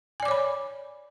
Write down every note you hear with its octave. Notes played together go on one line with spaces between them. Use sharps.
C#5 D5 G#5 B5 D6